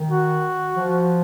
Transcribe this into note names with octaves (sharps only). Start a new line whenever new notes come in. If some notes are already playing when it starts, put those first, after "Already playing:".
Already playing: D#3
F#4
F3